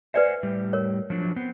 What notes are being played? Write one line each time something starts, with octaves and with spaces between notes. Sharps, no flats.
B4 C5 D5 E5 F#5 G#5
A2 G3 G4
A#4 C#5
F3 F#3 D4
B3 C4